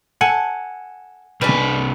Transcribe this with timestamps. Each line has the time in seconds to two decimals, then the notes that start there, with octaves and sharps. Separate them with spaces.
0.21 A4 F#5 G#5
1.41 C2 G3 C#4 B4